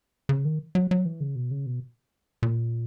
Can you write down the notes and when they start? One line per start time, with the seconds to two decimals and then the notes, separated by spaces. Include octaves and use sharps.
0.29 C#3
0.45 D#3
0.75 F#3
0.91 F#3
1.05 E3
1.21 C#3
1.36 B2
1.51 C#3
1.66 B2
2.43 A#2